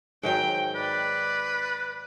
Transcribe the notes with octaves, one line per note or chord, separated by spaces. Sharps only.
G#2 D#3 F#3 G5
B4 D5